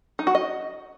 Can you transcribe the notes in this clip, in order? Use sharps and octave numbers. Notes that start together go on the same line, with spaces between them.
D#4
F#4
D#5